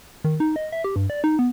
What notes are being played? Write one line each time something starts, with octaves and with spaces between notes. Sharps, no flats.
D#3
D#4
D#5
E5
G4
G2
D5
D#4
B3